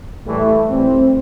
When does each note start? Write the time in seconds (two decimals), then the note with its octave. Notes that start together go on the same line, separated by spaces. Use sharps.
0.26 A2 E3 G3 A3
0.70 A2 E3 G3 C4